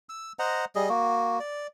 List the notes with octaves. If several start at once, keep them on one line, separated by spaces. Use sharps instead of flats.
E6
C5 D#5 F#5 A#5
G3 G#4 D#5
A#3 F#4
D5